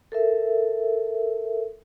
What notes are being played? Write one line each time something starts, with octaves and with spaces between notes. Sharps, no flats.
A4 A#4 E5